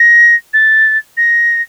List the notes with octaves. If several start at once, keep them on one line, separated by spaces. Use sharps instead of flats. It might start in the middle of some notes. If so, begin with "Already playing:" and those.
Already playing: A#6
A6
A#6